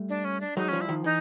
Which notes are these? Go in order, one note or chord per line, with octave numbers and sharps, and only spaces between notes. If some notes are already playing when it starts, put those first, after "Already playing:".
Already playing: G3 A3
D4
C#4
D4
F#3 G#3 D#4
F3 G3 C#4
E4
D#3 F3
E3 D#4